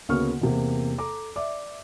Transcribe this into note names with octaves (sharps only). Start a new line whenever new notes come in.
D2 C#3 A#3 B3 C#6 F6
E2 C3 A#3
A4 A#5 D6
D5 E5 D6